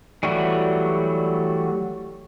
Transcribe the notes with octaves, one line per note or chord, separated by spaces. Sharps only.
E3 F#3 G3 A3 F#4